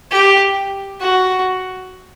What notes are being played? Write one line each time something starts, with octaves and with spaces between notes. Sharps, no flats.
G4
F#4